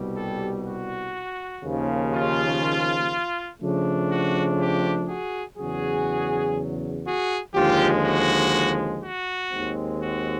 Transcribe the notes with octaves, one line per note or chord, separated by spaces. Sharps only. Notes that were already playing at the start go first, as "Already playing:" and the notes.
Already playing: C2 B2 G3
G4 A4
F#4
D#2 C#3 F3
F4
C#3 F3 A3 D4
F#4
F4 G4
F#4 G#4
E2 C#3 F#3 F#4 G#4
F#4 G#4
D#2 D3 F3 G#3 F4 G4
F#4
F#4
D#2 D#3 G#3 C4
F#4